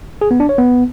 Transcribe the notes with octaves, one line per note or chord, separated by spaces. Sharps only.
G#4
B3
D4
C#5
B3